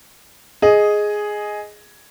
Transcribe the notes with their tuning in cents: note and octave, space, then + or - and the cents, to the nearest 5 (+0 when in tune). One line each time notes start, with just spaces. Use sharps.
G#4 +5 D#5 +0